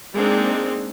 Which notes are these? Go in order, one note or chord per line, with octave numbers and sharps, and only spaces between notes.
G#3 A#3 C4 D4 D#4